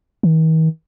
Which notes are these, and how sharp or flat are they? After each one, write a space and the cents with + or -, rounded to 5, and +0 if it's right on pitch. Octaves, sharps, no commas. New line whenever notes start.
D#3 +45